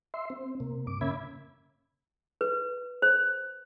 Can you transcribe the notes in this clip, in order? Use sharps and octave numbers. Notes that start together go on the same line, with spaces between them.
E5 C6
C4
C3 A#3
G2 D6
C#3 A#3 C#4 E5 B5 G#6
B4
C5